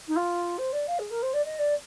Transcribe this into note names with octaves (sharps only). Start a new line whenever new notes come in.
D#4
F4
C5
D5
F5
G#4
A#4
C5
D5
D#5
D5